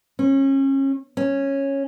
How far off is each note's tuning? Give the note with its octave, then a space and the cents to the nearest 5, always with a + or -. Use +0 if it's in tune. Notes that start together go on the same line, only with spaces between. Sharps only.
C#4 -30
C#4 -10